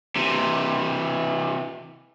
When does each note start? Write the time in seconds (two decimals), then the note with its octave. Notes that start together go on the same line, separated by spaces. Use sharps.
0.16 C3 E3